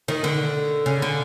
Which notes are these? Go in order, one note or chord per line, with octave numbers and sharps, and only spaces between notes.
D#3
D3
C#3
D3